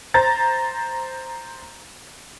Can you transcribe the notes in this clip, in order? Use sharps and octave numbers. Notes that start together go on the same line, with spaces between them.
C5 A#5 A6